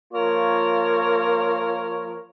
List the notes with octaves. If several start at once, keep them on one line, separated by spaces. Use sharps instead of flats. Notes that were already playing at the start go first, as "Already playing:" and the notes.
F3 A#3 F4 A#4 C#5